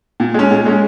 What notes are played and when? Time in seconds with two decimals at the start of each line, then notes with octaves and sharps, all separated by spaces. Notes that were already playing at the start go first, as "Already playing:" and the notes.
0.20 A#2
0.34 G#3 C#4
0.51 A#2
0.66 G#3 C#4